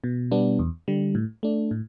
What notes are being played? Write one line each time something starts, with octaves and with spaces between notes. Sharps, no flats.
B2
G3 B3 D4
E2
D3 G3
A2
A3 D4
A2